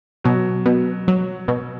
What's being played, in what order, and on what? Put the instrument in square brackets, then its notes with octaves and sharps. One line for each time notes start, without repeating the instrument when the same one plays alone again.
[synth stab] B2 [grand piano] F#3
[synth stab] B2
F#3
B2